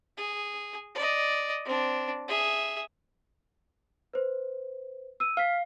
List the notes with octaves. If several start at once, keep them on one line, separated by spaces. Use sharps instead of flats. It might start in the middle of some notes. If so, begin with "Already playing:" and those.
G#4
D5 D#5
C4 D4
G#4 E5
B4 C5
E6 D#7
F5 F6 B6